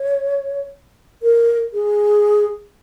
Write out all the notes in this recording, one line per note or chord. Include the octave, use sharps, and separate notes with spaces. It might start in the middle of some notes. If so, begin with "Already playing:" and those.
Already playing: C#5
A#4
G#4